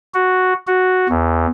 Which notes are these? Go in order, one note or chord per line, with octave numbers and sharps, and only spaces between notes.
F#4
F#4
E2